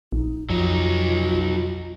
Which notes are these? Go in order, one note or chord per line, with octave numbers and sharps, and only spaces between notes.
A#1 D#4
F2 F#3 D#4 F4